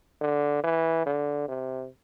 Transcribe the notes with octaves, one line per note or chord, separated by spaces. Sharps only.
D3
E3
D3
C3